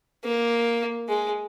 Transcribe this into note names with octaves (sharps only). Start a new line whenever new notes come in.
A#3
G#3